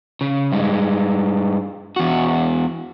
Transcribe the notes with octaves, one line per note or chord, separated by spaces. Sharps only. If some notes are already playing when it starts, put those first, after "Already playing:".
C#3
G2 G#3
E2 F#4